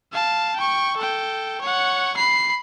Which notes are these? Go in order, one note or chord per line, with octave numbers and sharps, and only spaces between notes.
F5 A5
G5 C#6
A4 G5
C#5 F#5
B5 C7